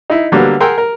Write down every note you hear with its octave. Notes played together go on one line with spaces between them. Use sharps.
D#4 E4
D3 F#3 G3 A#3 B3
G#4 A#4 F#5 G5 C6 E6
A#4